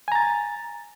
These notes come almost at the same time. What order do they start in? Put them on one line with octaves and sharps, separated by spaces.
G#5 A#5 A6